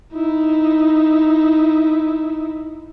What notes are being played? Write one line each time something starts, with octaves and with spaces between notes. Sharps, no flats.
D#4 E4